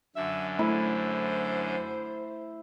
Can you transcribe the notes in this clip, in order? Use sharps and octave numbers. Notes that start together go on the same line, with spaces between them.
F#2 D3 E5
A3 E4 C5